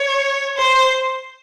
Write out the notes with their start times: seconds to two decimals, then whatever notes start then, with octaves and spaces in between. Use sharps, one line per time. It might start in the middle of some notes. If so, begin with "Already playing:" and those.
Already playing: C#5
0.57 C5